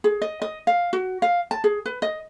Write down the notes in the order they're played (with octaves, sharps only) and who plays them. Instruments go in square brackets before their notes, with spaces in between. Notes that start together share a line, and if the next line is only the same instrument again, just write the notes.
[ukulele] G#4
D#5
D#5
F5
F#4
F5
A5
G#4
B4
D#5